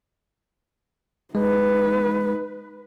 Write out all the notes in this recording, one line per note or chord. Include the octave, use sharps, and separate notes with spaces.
G#3 D#4 B4